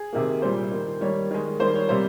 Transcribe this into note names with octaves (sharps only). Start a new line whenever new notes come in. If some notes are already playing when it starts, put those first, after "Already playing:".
Already playing: G#4
C3 D#3 A#3
A#2 G3 A#3 C5
D#3 A#3
D#3 G3 A#3 C#5
D#3 G#3
D#3 G3 A#3 C5
C#5
C3 G3 A#3 C5